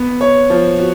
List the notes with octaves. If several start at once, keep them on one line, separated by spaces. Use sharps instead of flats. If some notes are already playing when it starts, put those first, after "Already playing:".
Already playing: B3
C#5
F3
F#4